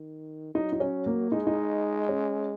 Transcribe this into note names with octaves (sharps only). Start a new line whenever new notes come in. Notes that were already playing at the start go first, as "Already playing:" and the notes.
Already playing: D#3
F#3 D#4
D#4
C#4
A#3
G#3 D#4
D#4
C#4